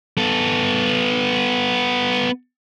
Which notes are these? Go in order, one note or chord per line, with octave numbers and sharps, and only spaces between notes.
B3 A4